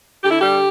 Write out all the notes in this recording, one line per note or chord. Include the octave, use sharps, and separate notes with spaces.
D3 G4
E4
G3 G4